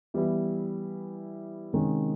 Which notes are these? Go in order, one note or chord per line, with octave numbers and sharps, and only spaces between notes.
E3 G3 B3 E4
C3 D#3 G#3 C#4